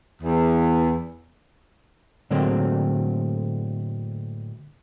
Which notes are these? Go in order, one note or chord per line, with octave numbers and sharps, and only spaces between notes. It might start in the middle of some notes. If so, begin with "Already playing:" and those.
E2
A2 D3 F#3 G#3 A#3 C4